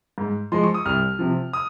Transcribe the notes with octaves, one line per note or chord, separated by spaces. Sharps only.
G#2
F3 G#3 C6
C#6
D#6
C2 F6
C3 F3
D#6